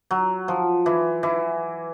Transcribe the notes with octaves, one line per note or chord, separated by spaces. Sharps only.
F#3
F3
E3
E3